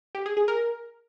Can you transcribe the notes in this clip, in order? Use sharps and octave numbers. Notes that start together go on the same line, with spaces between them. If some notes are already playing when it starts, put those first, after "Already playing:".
G4
G#4
G#4
A#4